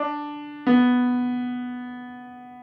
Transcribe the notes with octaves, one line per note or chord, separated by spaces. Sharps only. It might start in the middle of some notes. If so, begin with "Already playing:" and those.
Already playing: D4
B3